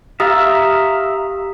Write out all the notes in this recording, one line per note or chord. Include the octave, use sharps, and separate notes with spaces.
G4 E5 F5 A#5 D#6